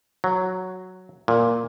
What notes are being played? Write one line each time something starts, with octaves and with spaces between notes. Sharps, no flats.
F#3
A#2